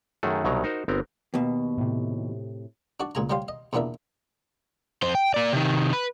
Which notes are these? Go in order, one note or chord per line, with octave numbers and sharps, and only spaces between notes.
F#2 D#3 A3 F#4 G#4
C2 B2 D#3 F#3 A#5
D#4 F#4 A#4 C5
G1 B3 C4 A#4
D#2 B2
A2 C3
D4 F#4 D5
C#2 A#2 G#4 G#5 A#5
F#3 G3 G4 C5 F5
D#5
E2 A#2 B3 D4 A#4 E5
F2 C5
G5
A#3 D5
C3 D#3
B4